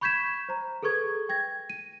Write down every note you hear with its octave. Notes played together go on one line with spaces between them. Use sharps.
B5 C#6 G6 G#6 B6 E7
C5 A#5
G#4 A4 B4 C#6 G#6
G5 G#6 A#6
D#7